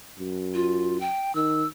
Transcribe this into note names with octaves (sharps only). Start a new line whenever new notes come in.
F#2
F4
G5
D#3 E6